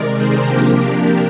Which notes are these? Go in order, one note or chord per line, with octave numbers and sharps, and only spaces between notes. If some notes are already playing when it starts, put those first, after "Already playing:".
Already playing: C3 D#3 G#3 A#4 D5
G#4 C5
C3 F3 A#3 D4 G4 A#4